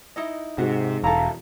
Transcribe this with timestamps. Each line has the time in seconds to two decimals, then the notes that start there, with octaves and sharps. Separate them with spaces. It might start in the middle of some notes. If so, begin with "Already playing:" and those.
0.16 D#4 E4 D#5
0.58 G#2 C3 F#4
1.04 E1 E4 A4 F5 A#5